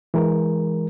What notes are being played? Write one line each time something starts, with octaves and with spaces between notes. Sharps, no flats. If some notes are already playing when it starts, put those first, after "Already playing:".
E3 G#3 A#4